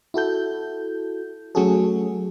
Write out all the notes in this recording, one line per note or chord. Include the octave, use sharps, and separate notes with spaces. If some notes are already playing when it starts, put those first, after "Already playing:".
E4 F#4 A4 G6
F#3 A3 C#4 F#4 G#4 A4